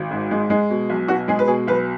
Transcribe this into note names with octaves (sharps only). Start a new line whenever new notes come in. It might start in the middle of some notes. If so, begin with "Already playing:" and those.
Already playing: G#1
G#2
G#3
G#3
B2
B1
B2 F#4
G#3 G#4
B4
B2 G#4
B1 B4